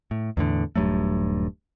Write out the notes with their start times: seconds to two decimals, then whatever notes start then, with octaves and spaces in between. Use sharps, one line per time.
0.11 A2
0.37 E2 A2 D3
0.76 D#1 G2 F#3 A3